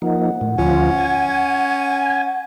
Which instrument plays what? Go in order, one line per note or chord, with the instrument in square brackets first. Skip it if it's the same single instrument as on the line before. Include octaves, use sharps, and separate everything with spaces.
[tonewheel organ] F3 A#3 D#4 [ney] F#5
[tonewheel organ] A2
[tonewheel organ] D2 F3 F4 [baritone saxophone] C#4
[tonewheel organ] G#5